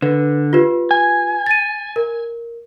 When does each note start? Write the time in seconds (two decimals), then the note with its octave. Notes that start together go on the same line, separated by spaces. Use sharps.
0.02 D3 B4
0.53 F4 G4 B4
0.91 G#5
1.46 A6 D#7
1.96 A#4